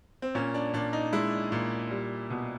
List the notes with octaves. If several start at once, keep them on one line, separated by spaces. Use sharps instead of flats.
C4
A#2 C#4
D4
A#2 D4
D#4
G#3 E4
A#2
G3
B2